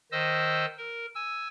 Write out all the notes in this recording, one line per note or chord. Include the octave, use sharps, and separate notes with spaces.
D#3 C5 D#5 E6
A#4
G#5 E6